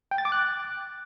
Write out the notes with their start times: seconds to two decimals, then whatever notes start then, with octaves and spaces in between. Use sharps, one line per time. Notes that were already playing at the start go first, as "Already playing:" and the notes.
0.11 G5
0.18 A6
0.25 D6
0.32 F#6